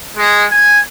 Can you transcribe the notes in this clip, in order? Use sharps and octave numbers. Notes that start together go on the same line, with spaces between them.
G#3
G#5